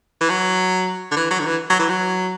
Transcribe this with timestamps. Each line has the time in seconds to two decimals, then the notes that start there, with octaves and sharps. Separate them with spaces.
0.21 E3
0.30 F#3
1.11 D3
1.16 E3
1.31 F#3
1.40 D3
1.46 E3
1.70 F#3
1.79 E3
1.89 F#3